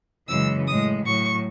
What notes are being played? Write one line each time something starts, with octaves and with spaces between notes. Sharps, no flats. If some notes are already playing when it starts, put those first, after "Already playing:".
F#2 C#3 E3 G#3 E6
A2 G#3 D#6
A2 F#3 C#6